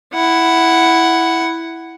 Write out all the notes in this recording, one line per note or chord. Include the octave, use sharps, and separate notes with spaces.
E4 F#5